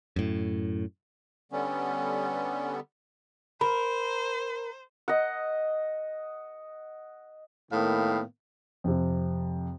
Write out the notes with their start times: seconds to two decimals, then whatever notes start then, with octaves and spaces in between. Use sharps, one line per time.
0.16 F#2 A2
1.52 D3 G3 B3 C#4
3.61 A#4 C5 B5
5.08 D#5 F#5
7.72 A2 D#3 A#3 B3 F5 G5
8.84 F2 C3